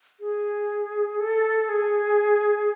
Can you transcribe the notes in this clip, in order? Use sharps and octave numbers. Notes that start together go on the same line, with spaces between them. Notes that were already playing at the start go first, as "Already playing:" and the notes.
G#4
A4
G#4